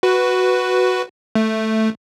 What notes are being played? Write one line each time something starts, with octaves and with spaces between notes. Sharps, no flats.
F#4 B4
A3